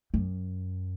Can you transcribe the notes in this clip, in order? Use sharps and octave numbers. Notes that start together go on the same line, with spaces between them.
F#2